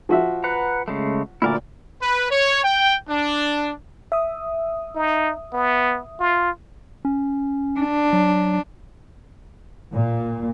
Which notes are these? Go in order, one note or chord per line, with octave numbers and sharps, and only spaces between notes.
F3 F#4 E5
B4 F#5 A#5
C#3 G#3 A3
D2 A#2 E4 A#4 D5
B4
C#5
G5
D4
E5 D#6
D#4
B3
F4
C#4
D4
F#3
A#2